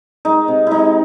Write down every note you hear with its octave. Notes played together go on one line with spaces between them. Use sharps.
G#3 D#4
C3
G#3 D#4 E4